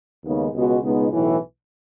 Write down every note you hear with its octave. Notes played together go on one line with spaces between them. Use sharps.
D#2 C#3 G#3 B3 D#4
C#2 B2 G#3 B3 F#4
C#2 B2 G#3 B3 D#4
B1 A2 E3